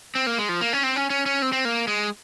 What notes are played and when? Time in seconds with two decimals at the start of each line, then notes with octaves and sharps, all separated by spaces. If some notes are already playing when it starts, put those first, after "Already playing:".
0.15 C4
0.27 A#3
0.38 G#3
0.49 F3
0.61 A#3
0.73 C#4
0.83 C4
0.96 C#4
1.10 C#4
1.26 C#4
1.42 C4
1.53 C4
1.65 A#3
1.87 G#3